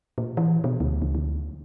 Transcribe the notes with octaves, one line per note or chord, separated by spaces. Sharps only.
A#2
E3
B2
D2
C#2
D2